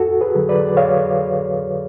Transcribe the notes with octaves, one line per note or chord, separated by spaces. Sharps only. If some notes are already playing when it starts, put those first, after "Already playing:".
Already playing: F2 F#4 A4
G#4 B4
D3 F#3
B4 D5
D5
F2 C#5 F5